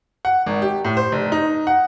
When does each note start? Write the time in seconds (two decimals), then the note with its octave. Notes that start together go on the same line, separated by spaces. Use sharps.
0.25 F#5
0.46 G#1
0.62 G4
0.85 A2
0.97 C5
1.12 F1
1.32 D#4
1.67 F#5